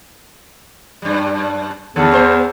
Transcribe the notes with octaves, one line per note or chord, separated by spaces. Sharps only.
F#2 G3
E2 D3 A4
B3 C5